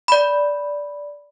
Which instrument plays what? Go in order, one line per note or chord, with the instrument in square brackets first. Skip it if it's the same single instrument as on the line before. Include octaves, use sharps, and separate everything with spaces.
[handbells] D5 B5